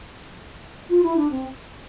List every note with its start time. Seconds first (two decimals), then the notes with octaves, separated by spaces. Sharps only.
0.89 F4
1.03 E4
1.16 D4
1.31 C4